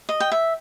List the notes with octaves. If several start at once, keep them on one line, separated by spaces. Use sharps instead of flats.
D#5
G5
E5